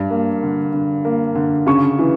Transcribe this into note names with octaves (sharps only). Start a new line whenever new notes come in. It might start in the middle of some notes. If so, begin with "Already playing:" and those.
Already playing: G2
A#3
D3
D3
A#3
D3
C#3 C#6
E3